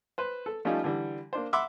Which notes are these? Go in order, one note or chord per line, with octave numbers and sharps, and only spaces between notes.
B4 C5
A4
F3 G3 A3 C#4 D#4 F4
D3 E3 G3
A#3 D4 C5
E5 F#5 B5 C6 D6 E6